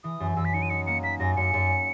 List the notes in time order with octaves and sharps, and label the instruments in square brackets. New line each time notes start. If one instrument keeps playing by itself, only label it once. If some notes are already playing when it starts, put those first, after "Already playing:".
[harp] E3 [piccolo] D#6
[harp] F#2
[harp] F#2 [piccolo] E6
[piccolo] B6
[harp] D#4 [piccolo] C#7
[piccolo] D#7
[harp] D#4 [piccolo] C#7
[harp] A#3 [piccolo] C#7
[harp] A#3 [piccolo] B6
[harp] F#2 [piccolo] A#6
[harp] F#2 [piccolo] C#7
[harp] F#2